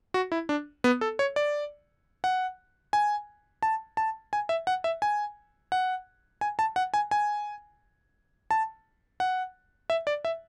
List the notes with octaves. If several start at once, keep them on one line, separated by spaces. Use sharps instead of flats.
F#4
E4
D4
B3
A4
C#5
D5
F#5
G#5
A5
A5
G#5
E5
F#5
E5
G#5
F#5
G#5
A5
F#5
G#5
G#5
A5
F#5
E5
D5
E5